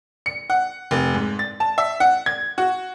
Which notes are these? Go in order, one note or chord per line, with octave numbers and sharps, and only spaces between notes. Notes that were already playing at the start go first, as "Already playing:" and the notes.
C#7
F#5
F1
G#2
A6
A5
E5
F#5
G#6
F#4